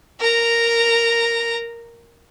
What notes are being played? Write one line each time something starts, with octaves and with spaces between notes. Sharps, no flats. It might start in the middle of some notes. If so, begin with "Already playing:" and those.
A#4 A#5